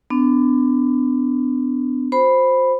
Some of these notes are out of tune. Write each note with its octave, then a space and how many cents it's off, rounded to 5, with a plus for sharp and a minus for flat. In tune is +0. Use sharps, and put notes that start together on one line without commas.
B3 +35 D4 +0
F#4 -35 C5 +0 B5 +0